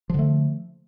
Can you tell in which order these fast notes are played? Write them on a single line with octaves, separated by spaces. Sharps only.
F3 D3 A3